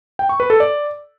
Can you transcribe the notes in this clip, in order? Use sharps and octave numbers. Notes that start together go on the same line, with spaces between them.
G5
C#6
B4
A4
D5